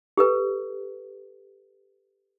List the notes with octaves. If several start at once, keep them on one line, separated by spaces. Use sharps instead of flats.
G4 A4 B4